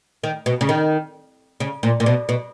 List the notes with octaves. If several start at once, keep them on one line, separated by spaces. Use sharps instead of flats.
D#3
B2
C#3
D#3
C#3
A#2
A#2
B2
B2